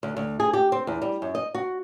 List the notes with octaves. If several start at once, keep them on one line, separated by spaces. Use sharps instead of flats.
D2
D2
G#4
G4
C4
E2
G3
F#2
D#5
F#4